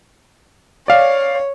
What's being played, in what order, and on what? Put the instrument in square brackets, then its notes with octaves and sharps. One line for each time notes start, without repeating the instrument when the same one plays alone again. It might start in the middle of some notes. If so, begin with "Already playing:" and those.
[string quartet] C#5 [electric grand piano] D5 F5